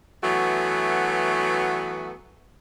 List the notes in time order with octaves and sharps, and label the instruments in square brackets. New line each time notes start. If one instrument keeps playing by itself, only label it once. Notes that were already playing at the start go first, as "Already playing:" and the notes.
[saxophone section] E3 F#3 A3 B3 F#4